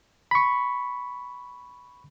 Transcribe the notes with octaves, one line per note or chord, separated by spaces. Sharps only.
B5 C#6